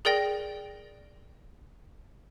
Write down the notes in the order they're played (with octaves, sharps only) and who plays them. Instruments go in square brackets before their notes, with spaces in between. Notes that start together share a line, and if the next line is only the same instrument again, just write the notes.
[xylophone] G#4 A#4 D5 G5 A#6